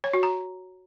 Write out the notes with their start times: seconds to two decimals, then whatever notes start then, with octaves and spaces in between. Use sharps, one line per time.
0.04 C#5
0.13 F#4
0.23 A#5